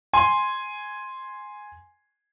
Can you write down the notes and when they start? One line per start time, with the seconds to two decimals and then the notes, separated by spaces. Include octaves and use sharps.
0.13 G#5 C6